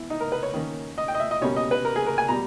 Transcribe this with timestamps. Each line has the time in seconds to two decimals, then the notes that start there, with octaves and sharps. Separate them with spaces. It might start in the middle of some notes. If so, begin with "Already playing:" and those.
Already playing: E3 B3 E4
0.10 D#4
0.20 A#4
0.32 B4
0.43 C#5
0.54 D#3 A#3 C#4
0.98 D#5
1.08 G5
1.15 D#5
1.20 E5
1.31 D#5
1.41 B2 G3 A#3 C#4 C#5
1.56 D#5
1.71 B4
1.85 A#4
1.96 G#4
2.07 A#4
2.18 G#5
2.28 B2 G3 A#5